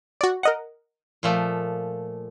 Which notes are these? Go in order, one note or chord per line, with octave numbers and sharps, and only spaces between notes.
F#4 D5
A#4 D#5 F#5
A#2 F3 A3